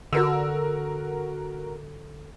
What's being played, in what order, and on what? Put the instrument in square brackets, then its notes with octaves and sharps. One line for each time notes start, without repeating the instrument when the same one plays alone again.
[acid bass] D3 [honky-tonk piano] F#4 A#4 E6